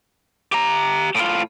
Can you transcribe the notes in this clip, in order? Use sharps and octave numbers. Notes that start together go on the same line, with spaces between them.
G4 A#5
A2 F4